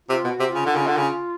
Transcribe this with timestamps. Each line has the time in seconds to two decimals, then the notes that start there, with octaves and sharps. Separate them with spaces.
0.09 C3 F4
0.24 B2
0.30 F#4
0.40 C3
0.50 C#3 F4
0.66 D3 F4
0.76 C#3
0.87 D3
0.97 C#3